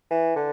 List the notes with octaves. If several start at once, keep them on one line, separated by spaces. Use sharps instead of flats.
E3
D3